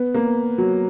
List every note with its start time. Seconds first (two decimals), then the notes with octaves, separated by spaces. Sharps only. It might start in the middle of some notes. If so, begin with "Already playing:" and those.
Already playing: B3
0.15 A#3
0.58 F#3